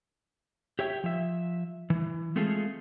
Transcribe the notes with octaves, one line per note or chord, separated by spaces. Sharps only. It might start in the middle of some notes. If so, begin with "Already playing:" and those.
G4 C#5 E5 G5
F3 E5
E3
G#3 A3 C4 F4 G#4 A4